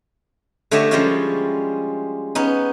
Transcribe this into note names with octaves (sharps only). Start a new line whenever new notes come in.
D3 A3 G4 C#5 D#5 A5
F3 G3 G#3 C#4 F4
B3 C#4 D#4